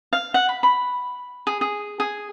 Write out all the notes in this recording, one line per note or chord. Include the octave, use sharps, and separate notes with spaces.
F5
F#5
B5
B5
G#4
G#4
G#4